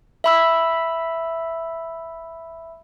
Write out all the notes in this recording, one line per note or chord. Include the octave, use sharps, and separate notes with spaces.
E5 B5 E6